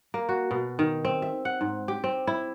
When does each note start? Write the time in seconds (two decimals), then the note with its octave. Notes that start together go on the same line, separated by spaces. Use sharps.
0.14 A#3
0.29 F#4
0.51 B2
0.79 D#3
1.05 C4
1.22 E5
1.45 F#5
1.61 G#2
1.88 G4
2.04 C4
2.27 E4